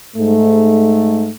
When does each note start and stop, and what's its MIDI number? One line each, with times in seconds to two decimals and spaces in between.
0.16 1.30 44
0.16 1.30 57